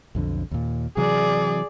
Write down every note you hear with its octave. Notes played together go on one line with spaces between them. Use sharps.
B1 F2 D3
D#2 A#2
C3 E3 F#3 G#4 D5